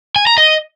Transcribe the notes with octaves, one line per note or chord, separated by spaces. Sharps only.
G#5
A#5
D#5